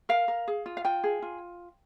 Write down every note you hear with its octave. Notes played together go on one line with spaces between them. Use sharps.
A#4 F5
A#4
G#4
F4
F5
F4 G5
G#4
F4